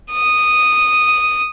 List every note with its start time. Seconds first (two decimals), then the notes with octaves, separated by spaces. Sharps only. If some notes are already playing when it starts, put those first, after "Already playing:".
0.11 D#6